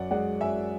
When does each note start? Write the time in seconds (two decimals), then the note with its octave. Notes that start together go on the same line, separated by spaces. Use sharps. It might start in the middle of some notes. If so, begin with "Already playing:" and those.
Already playing: F#2 D5 F#5
0.11 G#3 D5 F#5
0.41 F#2 E5 G#5